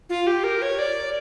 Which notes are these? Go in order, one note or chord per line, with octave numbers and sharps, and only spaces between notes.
F4
G4
A#4
C#5
D5